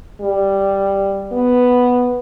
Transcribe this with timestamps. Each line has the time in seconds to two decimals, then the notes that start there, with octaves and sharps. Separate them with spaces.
0.21 G3
1.32 B3